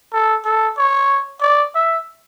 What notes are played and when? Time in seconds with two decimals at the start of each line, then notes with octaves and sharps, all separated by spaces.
0.13 A4
0.45 A4
0.78 C#5
1.41 D5
1.75 E5